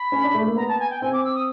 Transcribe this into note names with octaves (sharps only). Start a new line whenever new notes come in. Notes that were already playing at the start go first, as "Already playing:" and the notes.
Already playing: B5
C#4
D4
A3
A#3
B3 A#5
A5
G#5
G5
C4 G#5
D6
E6
D#6